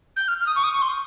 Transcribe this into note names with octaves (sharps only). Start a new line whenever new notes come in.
G6
F6
F6
D#6
C#6
D#6
C#6
C6